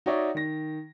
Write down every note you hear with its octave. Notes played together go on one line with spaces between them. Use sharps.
D#4 F#4 C#5 D5 E5
D#3 A#6